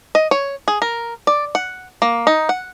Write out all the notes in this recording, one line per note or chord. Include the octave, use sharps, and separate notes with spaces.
D#5
C#5
G#4
A#4
D5
F#5
A#3
D#4
F#5